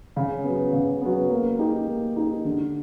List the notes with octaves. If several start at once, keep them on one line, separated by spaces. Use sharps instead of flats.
C#3
F#3 B3
C#3
F#3 B3
A#3
D#4 G4
A#3
D#4 G4
D3